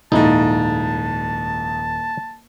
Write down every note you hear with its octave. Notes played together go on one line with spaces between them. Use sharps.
D#1 F2 G#2 D#4 E4 A5